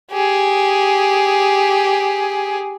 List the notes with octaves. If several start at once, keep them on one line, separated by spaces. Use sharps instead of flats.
G4 G#4